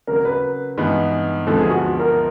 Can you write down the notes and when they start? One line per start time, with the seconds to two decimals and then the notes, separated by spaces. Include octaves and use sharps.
0.07 C#3 F#3 A#3 A#4
0.25 B4
0.78 G2 E3 G#3 B3 D#4
1.47 D2 D3 F3 G#3 B3 A4
1.58 G#4
1.70 F#4
1.99 A#4